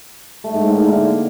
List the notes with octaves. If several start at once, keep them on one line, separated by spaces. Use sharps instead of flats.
A3
G#2
A2
A#3
D3